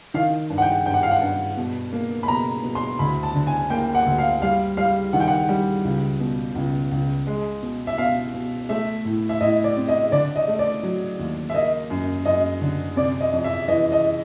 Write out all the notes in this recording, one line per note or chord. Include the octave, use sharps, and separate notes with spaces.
D#3 F5
G2
F#5
G5
G2 G5
F#5
F5
F#5
G2
B2
A#3
B5
B2 A#5
B2
C6
D2 B5
A5
D3
G#5
A#3 G5
F#5
D2
F5
G3 F5
G3 F5
D#3 F#5
G5
F#5
G3
C#2
B2
C#2
C#2
G#3
B2
E5
B2 F5
B2
A3 E5
A2
E5
A2 D#5
D5
C4
D#5
D3 D5
D#5
A3
D5
F#3
D#2
E5
A#3 D#5
F#2
F#2 D#5
D3
C3 D5
D#5
F2
E5
E3 D#5
D#5